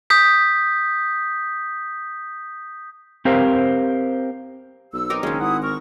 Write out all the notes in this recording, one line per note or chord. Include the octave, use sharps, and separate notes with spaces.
D#6 G6 B6
C4 G4 A#4 C5 F5
B1 E6
C4 D#4 A#4 D6
F#1 D#3 G#3 C#4 F5
G#1 E4 F#5 D#6
A#4 C#6